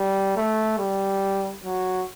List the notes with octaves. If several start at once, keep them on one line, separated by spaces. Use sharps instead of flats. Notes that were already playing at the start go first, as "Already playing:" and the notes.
Already playing: G3
A3
G3
F#3